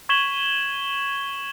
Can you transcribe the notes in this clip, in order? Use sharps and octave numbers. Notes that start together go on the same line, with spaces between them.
C#6 G#6 B6 E7 F#7 G7